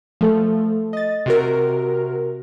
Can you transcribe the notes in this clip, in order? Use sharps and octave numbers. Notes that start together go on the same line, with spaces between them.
F3 A3 A4
D#5 A6
C3 F#4 A#4